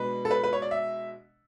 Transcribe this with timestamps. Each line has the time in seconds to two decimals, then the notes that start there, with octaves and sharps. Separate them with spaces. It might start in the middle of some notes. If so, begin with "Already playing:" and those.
Already playing: B2 G#3 D4 B4
0.25 A4
0.31 B4
0.44 B4
0.53 C#5
0.62 D5
0.71 E5